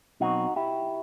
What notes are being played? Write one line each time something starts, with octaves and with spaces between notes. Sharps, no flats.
B2 F#3 C4 D#4 F#4
E4 G4